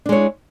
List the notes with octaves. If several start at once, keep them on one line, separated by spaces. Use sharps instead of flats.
G#3 D4 E4 C#5